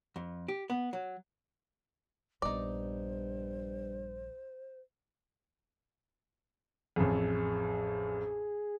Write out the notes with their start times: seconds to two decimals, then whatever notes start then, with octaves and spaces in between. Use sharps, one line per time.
0.16 F2
0.48 G4
0.70 B3
0.93 F#3
2.42 A#1 G2 B3 D#4 C5 D5
6.96 A1 F2 G#4